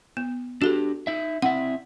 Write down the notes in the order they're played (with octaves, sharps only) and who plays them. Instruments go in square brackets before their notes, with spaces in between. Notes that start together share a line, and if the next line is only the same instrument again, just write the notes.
[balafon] B3
[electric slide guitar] D4 G4 [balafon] F#4 A4
[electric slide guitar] D#4 E5
[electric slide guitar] C4 E4 E5 [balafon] F#5